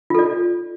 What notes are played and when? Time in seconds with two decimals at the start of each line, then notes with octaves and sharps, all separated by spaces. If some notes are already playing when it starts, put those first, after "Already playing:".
0.10 F4
0.15 A4
0.19 D5